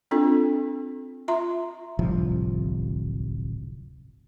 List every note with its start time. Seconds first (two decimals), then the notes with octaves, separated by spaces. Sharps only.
0.11 C4 D4 F4 A4
1.28 F4 E5 A#5 C6
1.99 D1 G1 C2 F3